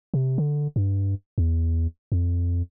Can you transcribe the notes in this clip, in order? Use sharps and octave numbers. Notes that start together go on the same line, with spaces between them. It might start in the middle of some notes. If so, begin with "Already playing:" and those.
C3
D3
G2
E2
F2